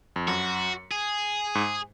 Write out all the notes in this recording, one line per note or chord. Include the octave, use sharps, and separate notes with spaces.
F2
F#2 F#4
G#4
G#2